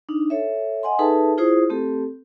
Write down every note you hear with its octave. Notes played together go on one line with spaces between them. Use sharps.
D4 D#4
A4 C#5 E5
D#5 F#5 G#5 C6
D#4 G#4 A4 B4 E5 A5
E4 F4 G#4 C5 D#6
A3 C4 G4 A4